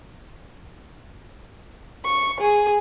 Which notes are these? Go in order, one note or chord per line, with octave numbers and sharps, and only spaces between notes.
C#6
G#4